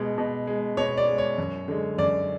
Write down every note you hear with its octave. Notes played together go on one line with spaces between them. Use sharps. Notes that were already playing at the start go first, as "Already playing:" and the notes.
Already playing: B2 G#3
B2
G#3
B2 C#5
D5
G#3
C#5
F#2
D3 G#3
F#2 D5